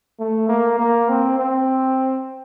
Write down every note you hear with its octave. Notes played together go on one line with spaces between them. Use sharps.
A3
A#3
A#3
C4
C4